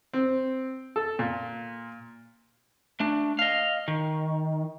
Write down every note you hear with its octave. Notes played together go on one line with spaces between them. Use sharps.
C4
A4
A#2
A3 D4
D#5 F5
D#3